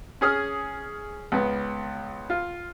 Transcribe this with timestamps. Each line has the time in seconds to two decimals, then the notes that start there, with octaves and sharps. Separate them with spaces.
0.21 C#4 G#4 D#6 F6
1.32 C#2 B3
2.30 F4